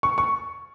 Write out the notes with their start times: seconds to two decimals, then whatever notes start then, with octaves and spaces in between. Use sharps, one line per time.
0.03 C#6
0.18 C#6